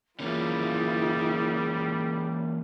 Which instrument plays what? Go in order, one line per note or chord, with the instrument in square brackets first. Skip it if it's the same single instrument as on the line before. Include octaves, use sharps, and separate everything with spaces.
[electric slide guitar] E3 A#3 C#4 [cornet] G3 [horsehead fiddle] E4 F4 [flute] G#4